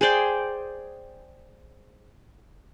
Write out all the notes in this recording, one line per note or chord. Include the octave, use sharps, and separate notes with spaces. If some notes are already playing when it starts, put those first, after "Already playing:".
G#4 C5 D5 G5